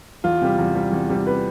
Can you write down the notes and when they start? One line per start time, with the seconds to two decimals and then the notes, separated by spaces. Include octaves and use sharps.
0.24 E2 F4
0.42 C3 G3
0.58 E2
0.76 C3 G3
0.92 E2
1.10 C3 G3
1.27 B4